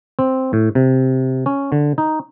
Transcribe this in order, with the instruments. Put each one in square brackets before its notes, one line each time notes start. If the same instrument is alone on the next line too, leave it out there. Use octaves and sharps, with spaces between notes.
[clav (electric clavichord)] C4
A2
C3
C#4
D3
D#4